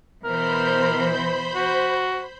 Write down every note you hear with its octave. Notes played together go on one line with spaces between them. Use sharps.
B2 E3 A#4 C5 B5 G6
F#4